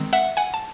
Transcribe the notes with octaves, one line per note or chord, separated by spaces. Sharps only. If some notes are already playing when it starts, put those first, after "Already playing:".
Already playing: D#3 G#3 C4
E5 F#5
F#5 G#5
A5